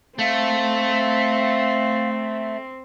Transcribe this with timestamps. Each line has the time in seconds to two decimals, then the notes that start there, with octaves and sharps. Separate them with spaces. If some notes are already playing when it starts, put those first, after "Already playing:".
0.19 A3 C4 F5